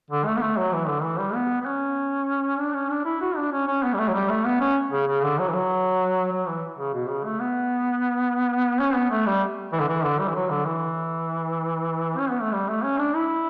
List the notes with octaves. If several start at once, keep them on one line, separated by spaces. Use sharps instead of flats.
D3
A3
B3
A3
F#3
E3
D3
E3
G3
B3
B3
C#4
D4
C#4
D4
E4
F#4
D4
C#4
C#4
B3
G3
A3
F#3
G3
A3
B3
C#4
C#3
C#3
D3
F#3
E3
F#3
F#3
E3
C#3
B2
C#3
A3
B3
C#4
B3
A3
G3
E3
D3
E3
D3
G3
E3
F#3
D3
E3
C#4
B3
A3
G3
A3
C#4
D4
E4